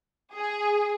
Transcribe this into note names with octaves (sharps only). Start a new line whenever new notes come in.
G#4